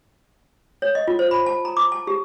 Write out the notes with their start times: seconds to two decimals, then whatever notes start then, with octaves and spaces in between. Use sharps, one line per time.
0.82 C#5
0.95 D#5
1.07 F4
1.19 C5
1.31 B5
1.46 A5
1.65 A#5
1.77 D6
1.92 A5
2.07 G4